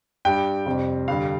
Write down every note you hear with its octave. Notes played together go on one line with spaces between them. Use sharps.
G2 G3 G5
F2 C3 G3
G2 D3 G3 F5